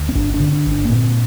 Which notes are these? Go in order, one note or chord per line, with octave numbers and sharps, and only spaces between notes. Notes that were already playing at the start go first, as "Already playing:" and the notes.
Already playing: D2
C4
G1 D4
D4
D3
D4
G1
D4
A#3
A#2 C4